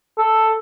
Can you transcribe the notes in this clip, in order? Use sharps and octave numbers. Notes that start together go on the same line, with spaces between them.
A4